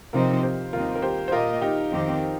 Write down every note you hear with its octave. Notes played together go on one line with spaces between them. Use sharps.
C3 F3 C4 D#4 F4 A#4
G4 C5
D#2 D#3 G3 C4 D#4 F4 A#4
A#4
G4 C5
C5
A#2 A#3 F4 G4 A#4 D#5
D#4 G4
F2 D#3 C4 G4